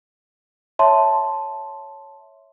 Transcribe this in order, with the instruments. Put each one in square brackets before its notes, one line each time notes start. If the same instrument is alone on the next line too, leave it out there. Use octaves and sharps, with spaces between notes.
[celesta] C#5 E5 A5 C6